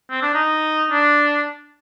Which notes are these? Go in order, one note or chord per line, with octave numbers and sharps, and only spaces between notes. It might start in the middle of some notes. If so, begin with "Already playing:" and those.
C4
D4
D#4
D4